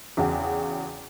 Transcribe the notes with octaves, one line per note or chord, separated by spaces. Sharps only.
E2 C#3 F#4 G5